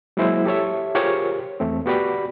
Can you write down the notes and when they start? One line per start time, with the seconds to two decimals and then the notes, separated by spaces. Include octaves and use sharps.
0.17 F#3 G#3 A#3 E4 F#4 C5
0.45 G4 A4 C#5 E5
0.95 F4 G4 G#4 A#4 C5 C#5
1.60 E2 A3 C4
1.86 B3 F#4 G4 D5 B5